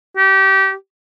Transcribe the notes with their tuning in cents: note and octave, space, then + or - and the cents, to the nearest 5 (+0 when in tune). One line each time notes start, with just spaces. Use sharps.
G4 -25